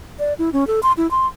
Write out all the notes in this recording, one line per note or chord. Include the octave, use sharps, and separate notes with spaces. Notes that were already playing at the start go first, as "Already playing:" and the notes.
D5
E4
C#4
A4
C6
E4
C6